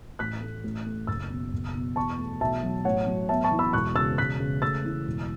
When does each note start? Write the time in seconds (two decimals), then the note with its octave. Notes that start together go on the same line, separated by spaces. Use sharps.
0.19 A1 F#6 B6
0.41 A3
0.64 A1
0.86 A3
1.07 F#1 E6 A6
1.30 B2
1.53 F#1
1.75 B2
1.96 E2 A5 C#6
2.18 A3
2.41 B1 E5 A5
2.63 F#3
2.85 A1 C#5 F#5
3.07 F#3
3.29 B3 E5 A5
3.44 A5 C#6
3.51 E3
3.59 B5 E6
3.73 E1 C#6 F#6
3.95 C#3 E6 A6
4.18 E1 F#6 B6
4.40 C#3
4.62 A3 E6 A6
4.84 E3
5.07 E1